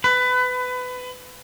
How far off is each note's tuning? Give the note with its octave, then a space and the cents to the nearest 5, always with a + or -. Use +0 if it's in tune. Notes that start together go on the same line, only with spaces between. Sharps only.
B4 +25